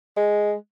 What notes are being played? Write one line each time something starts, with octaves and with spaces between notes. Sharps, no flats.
G#3